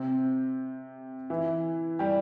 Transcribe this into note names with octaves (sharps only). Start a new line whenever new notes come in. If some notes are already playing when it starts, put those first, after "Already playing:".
Already playing: C3 C4
E3 E4
G3 G4